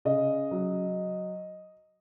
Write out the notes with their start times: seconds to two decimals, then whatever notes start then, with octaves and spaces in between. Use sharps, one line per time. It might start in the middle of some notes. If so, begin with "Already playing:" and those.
0.05 C#3 D#5
0.51 F#3